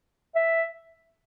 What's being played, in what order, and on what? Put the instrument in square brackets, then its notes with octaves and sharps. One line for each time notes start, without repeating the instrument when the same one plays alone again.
[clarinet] E5